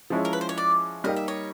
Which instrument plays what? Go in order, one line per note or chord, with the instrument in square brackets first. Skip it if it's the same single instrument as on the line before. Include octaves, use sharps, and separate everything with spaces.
[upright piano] F3 G#3 C#4 E4
[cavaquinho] A#4
B4
C5
C#5
D5
[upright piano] G3 A#3 D#4 G4 [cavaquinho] D#5
[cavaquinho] E5
C#5 D#5